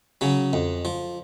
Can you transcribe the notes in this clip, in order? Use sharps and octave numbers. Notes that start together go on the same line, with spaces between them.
C#3 F#3
F2
F3